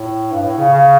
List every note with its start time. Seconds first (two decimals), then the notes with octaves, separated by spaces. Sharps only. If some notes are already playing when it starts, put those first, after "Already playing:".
Already playing: A2
0.32 G2
0.43 A2
0.58 C#3
0.73 C#3